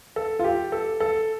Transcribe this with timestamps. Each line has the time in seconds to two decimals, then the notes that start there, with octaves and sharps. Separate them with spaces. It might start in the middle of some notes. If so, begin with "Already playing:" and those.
0.16 A4
0.39 F4
0.44 G4
0.72 A4
1.00 A4